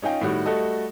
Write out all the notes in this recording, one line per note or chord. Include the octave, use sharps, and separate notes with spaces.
C#4 D#4 F4 G5
A2 D#3 G3 F#4
G3 A3 F#4 A4 D#5